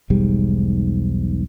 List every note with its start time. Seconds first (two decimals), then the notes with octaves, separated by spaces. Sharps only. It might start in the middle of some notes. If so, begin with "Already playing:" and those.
0.10 E1 B1 G#2 G3